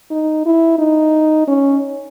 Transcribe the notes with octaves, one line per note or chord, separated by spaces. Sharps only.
D#4
E4
D#4
C#4